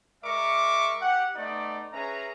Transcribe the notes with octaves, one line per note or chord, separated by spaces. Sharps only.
G#3 A#4 D5 E5 C#6 D6
G4 F#5
A3 B3 D#4 D5
C#4 G#4 B4 E5 A#5